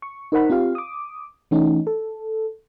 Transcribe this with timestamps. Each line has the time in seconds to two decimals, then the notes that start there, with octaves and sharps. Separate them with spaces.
0.02 C#6
0.32 D#4 A#4 C5 F#5 B5
0.50 C4 F4 G4 F5
0.75 D6 D#6
1.51 E3 A3 C#4 D#4
1.87 A4